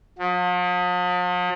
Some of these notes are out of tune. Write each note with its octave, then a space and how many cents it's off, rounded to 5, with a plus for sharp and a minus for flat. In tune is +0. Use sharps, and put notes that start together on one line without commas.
F3 +45